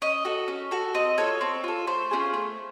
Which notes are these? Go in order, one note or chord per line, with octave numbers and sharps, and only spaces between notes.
C#4 D#5
F#4 A4
C#4
F#4 A4
C4 D#5
F4 A4 C#5
C4
F4 A4
A3 C5
C#4 F4 G#4
A3